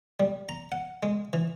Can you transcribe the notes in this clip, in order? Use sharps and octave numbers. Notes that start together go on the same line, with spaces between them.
G3
A#5
F#5
G#3
E3